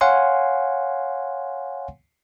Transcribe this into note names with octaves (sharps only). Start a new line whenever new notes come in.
C#5 F5 F#5 G#5 C6